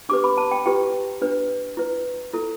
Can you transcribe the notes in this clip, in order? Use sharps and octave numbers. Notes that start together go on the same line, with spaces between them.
D4 G4 B4 D6
B5
A5
G5
E4 G4 B4 G5
D4 B4
E4 B4
E4 A4